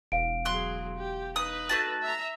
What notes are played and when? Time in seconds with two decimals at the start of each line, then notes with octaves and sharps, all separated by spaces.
0.12 E1 F5 D7
0.45 F#3 G#4 C6 F#6
0.97 G4
1.36 D#4 B4 D#6
1.69 A3 F#4 A5
2.02 E5 A#5